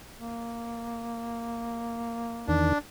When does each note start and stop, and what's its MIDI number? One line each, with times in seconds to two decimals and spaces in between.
0.20 2.68 58
2.48 2.73 40
2.48 2.73 51
2.48 2.78 62